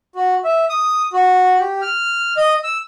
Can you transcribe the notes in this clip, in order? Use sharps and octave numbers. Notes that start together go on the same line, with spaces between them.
F#4
E5
D#6
F#4
G4
F6
D#5
E6